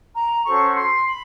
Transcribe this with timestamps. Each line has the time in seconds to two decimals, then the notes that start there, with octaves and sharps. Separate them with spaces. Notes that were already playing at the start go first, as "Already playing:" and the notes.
0.16 A#5
0.45 C#4 F#4 A4 C5 C#6
0.75 C6
1.06 B5